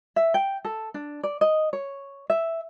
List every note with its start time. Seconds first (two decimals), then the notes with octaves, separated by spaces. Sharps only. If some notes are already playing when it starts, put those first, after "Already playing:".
0.16 E5
0.34 G5
0.65 A4
0.94 D4
1.23 D5
1.41 D#5
1.73 C#5
2.30 E5